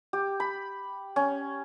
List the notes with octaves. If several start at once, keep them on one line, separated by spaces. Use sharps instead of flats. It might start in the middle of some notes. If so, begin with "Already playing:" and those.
G4
B5
C#4